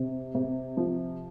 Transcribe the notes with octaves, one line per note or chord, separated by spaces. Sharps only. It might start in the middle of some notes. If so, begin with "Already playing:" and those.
Already playing: C3
C3
F3